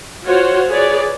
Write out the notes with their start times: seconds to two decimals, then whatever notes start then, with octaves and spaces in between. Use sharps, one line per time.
0.24 F4 F#4 C5 C#5 F#5
0.70 G#4 B4 C#5 D5